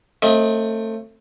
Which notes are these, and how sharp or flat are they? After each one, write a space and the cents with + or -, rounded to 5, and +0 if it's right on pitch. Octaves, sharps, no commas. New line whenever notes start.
A3 +25 C4 +40 D#5 +35